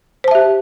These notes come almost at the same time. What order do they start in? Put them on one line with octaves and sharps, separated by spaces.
C5 A5 E5 G4